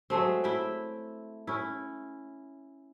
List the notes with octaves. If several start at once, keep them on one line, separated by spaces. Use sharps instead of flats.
F#3 G#3 A3 C4
E4 E5 G5
C#4 E4